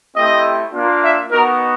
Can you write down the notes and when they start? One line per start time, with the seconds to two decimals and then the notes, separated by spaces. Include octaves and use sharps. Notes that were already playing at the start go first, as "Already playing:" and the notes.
0.16 A3 C4 E4 G4 D#5
0.73 A#3 D4 F4
1.02 E5
1.31 B3 D#4 F#4 A#4